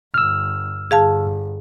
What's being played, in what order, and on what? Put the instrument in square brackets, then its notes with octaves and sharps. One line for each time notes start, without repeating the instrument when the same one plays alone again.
[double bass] G1 [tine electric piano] E6 F6
[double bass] G1 [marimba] G#4 F5 A5